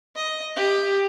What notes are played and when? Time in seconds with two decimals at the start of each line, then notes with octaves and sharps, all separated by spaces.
0.15 D#5
0.56 G4